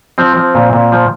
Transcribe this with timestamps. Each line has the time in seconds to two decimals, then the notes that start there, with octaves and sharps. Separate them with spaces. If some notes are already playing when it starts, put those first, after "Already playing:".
0.18 F3 C4
0.36 F3
0.55 A#2
0.73 A#2
0.92 F3